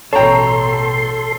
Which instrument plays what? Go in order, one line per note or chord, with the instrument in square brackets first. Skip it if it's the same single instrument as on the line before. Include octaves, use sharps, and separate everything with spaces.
[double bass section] A1 B2 [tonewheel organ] A4 C6 [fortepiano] C#5 G5 [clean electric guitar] A5 A#5